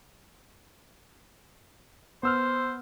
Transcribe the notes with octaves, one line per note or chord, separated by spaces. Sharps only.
B3 C5 E6 F6